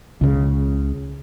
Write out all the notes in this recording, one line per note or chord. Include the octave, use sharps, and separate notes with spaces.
C#2 C#3